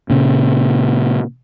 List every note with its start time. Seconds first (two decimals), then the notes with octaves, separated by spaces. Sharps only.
0.10 A#2 C#3